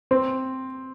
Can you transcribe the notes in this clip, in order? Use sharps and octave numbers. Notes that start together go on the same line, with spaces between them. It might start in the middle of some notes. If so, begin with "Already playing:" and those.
C4